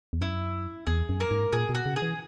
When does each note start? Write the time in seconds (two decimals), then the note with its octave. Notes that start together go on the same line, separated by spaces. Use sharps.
0.13 E2
0.21 F#2 E4
0.87 E2 G#4
1.09 F#2
1.20 A#3 A#4
1.31 G#2
1.53 A#2 G#4
1.69 B2
1.75 F#4
1.86 C#3
1.96 G#4
2.02 E3